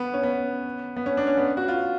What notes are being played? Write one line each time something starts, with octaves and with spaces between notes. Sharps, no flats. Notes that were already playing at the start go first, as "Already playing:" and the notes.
Already playing: B3
C#4
B3
B3
C#4
D4
C#4
B3
F#4
F4